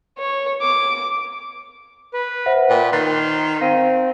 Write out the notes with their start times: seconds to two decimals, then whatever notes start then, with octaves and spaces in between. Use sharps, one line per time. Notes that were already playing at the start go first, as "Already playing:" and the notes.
0.18 C#5
0.62 D6
2.13 B4
2.46 C5 E5 F#5
2.70 A#2 B4 G5
2.93 D#3 C6 F#6 A6
3.61 C4 F5 D#7